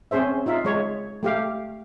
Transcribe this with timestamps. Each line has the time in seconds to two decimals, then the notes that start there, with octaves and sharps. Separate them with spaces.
0.11 C4 C#4 G#4 C5 E5
0.46 D#4 F4 E5
0.65 G#3 C#5
1.23 A3 G4 F5